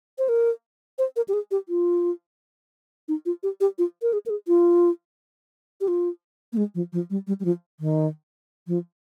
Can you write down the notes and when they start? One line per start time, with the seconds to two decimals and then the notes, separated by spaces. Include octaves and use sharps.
0.18 C5
0.29 A#4
0.99 C5
1.16 A#4
1.28 G4
1.33 G#4
1.51 G4
1.69 F4
3.08 D#4
3.26 F4
3.43 G4
3.61 G4
3.78 F4
4.02 A#4
4.13 G#4
4.26 A#4
4.30 G#4
4.48 F4
5.81 G4
5.88 F4
6.53 A#3
6.57 G#3
6.75 F3
6.93 F3
7.10 G3
7.27 G3
7.40 G3
7.45 F3
7.80 D#3
8.67 F3